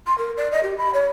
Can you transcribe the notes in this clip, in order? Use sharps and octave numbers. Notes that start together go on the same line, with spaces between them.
C6
A#4
D5
D#5
G4
B5
C#5